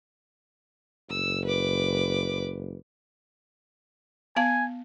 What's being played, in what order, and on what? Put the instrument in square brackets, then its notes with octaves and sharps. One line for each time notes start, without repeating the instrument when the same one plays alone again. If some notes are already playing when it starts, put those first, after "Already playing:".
[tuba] F#1 [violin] E6
[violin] B4 D6
[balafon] B3 F5 A5 [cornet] G#5